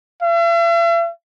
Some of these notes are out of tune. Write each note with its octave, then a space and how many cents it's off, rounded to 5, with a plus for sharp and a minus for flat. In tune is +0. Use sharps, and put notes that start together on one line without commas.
E5 +45